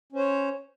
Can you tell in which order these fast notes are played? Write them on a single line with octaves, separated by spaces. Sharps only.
C#4 C5 C#5